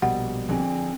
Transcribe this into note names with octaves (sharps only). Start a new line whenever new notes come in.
A#1 B2 G3 F#5
F2 D3 C4 G#4